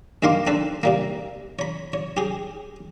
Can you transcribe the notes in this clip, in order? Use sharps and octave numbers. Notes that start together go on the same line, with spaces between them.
G2 D#3 A#3 F5 C6 D6
C4 D4 A4 B4
C3 G3 A#3
C#5 B5
C#5
G4 G#4